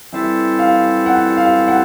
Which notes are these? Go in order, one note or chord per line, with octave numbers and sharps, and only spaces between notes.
E3 G3 C4 E4 A4 E5
F5
F#5
F5
F#5